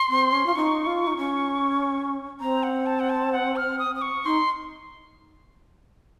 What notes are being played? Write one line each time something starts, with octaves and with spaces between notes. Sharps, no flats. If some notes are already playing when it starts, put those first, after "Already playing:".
Already playing: C6
C4
C#4
F4
D#4 C#6
F4
D#4
C#4
C4 A#5
F#5
A5
F#5
A5
F#5
F6
D#6
D#6
C#6
D#4 C6